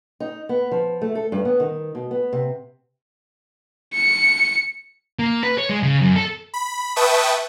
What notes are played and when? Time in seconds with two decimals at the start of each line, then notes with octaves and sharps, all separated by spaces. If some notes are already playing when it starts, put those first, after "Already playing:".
0.20 D#4
0.49 B3
0.71 F3
1.01 A3
1.15 A4
1.32 G2
1.45 B3
1.60 D#3
1.95 B2
2.11 B3
2.33 C3
3.94 C#7
5.19 A#3
5.43 B4
5.58 C#5
5.70 G#3
5.83 C#3
6.01 F#2
6.16 A4
6.54 B5
6.96 B4 E5 G5 A5 C#6 D#6